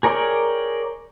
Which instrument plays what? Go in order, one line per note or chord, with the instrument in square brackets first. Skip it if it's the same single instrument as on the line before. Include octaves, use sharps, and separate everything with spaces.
[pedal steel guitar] G#4 A#4 C#5 D5 G5